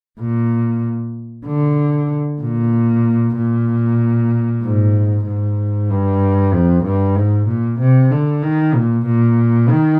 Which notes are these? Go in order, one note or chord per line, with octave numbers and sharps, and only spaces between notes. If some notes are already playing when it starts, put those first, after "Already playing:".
A#2
D3
A#2
A#2
G#2
G#2
G2
F2
G2
G#2
A#2
C3
D3
D#3
A#2
A#2
D#3